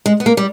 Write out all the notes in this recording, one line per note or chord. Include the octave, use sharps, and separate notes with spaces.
G#3
B3
A#3
G3